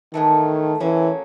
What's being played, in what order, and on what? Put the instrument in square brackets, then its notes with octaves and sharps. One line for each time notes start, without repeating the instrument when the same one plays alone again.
[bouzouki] A2 E3 A3 [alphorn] D#3
[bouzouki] A2 F#3 A#3 C#4 [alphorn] E3